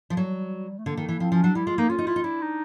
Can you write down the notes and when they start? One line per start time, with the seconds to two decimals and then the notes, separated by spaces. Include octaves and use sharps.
0.10 F3
0.17 F#3 G3
0.79 A3
0.86 D3 A#3
0.97 D#3
1.09 E3
1.20 F3 C4
1.32 F3 C#4
1.43 F#3 D4
1.55 G3 E4
1.67 G#3 F4
1.78 A#3 D#4
1.90 C#4 F4
1.99 D#4
2.07 E4 F4
2.16 D#4
2.24 D4 E4
2.41 D#4